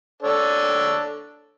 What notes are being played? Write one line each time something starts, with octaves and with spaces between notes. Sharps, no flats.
D4 A4 C#5